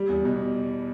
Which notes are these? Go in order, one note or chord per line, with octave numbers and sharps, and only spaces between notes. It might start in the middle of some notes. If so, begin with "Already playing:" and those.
Already playing: G3
E2
B2